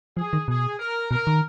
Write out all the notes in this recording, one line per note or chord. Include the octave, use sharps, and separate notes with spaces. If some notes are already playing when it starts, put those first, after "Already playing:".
F3 G#4
D#3
B2 G#4
A#4
B2 A#4
D#3